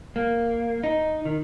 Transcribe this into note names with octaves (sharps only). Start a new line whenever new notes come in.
A#3
D#4
D#3